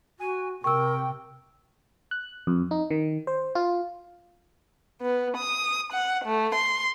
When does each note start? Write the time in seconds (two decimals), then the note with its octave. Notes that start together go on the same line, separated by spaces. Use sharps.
0.20 F#4 G#5
0.64 C3 A#4 G5 C#6 E6
2.11 F#6
2.47 F2
2.71 D#4
2.91 D#3
3.27 C5
3.55 F4
5.02 B3
5.36 D#6
5.92 F#5
6.25 A3
6.54 C6